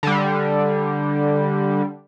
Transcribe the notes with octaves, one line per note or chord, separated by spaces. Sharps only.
D3 G3